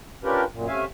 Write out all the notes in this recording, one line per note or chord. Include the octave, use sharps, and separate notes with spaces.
C#4 D4 F4 G4 A#4 B4
F#2 A#2
C3 A3 C#4 E5 F5 G#5